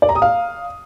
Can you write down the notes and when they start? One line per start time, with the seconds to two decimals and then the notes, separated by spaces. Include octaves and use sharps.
0.02 D5
0.09 A#5
0.15 D#6
0.22 F5